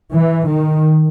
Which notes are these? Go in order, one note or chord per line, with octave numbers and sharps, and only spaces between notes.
E3
D#3